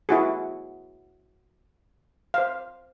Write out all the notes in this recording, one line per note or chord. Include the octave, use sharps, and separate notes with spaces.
E4 F#4 G#4
C5 F5